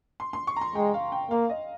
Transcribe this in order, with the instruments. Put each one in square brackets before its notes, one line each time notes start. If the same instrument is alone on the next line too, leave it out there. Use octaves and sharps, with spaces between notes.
[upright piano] C6
C6
C#6
A#5
C6
[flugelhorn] G#3 [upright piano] G5
[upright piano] F5
G5
[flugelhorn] A#3 [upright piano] F5
[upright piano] D#5